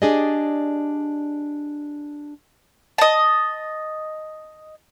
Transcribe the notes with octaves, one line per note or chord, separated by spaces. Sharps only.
D4 G4 G#4 D5 D#5
D#5 A5